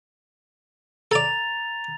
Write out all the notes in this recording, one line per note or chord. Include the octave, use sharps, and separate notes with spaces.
A4 D5 A#5 A6 F7